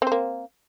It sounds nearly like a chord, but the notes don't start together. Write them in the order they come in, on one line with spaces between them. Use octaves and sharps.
C4 C5 A#3